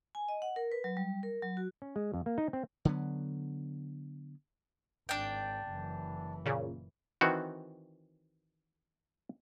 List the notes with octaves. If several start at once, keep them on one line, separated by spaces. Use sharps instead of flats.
G#5
D#5
F#5
A#4
B4
F#3
G3
A#4
F#3
F#4
C#4
G#3
F2
A#3
D#4
C4
D3 F#3 B3
G#1 D4 G5
F#1 E3
A#2 C#3
D#3 E3 C4 F#4